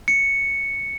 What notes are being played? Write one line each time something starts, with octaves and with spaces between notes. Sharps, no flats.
C#7